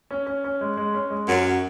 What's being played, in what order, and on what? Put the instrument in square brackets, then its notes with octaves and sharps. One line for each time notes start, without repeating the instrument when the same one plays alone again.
[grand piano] C#4
C#4
C#4
G#3
G#3
C#4
G#3
[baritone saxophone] F#2 [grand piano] C#4
[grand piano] F#4